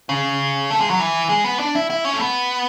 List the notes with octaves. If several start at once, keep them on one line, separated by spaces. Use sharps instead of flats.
C#3
A3
G#3
F#3
E3
G#3
B3
D4
E4
E4
C#4
A3
B3